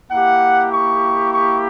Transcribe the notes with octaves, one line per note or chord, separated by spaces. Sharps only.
A#3 E4 G4 F#5
C#6
C#6